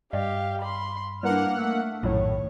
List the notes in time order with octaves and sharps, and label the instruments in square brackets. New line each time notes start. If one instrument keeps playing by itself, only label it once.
[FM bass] G2 [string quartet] G4 F5 [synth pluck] D5 D#5
[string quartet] B5 C6
[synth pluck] G3 E4 B4 [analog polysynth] A#3 F#5 [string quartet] D4 F6
[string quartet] A3 [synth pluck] E6
[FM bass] A#1 [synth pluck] F#2 F#3 [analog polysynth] A2 [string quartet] D#3 C#5